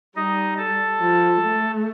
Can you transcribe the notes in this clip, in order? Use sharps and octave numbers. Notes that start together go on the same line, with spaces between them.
G3 D#4 D#5
A4 A5
F3
A3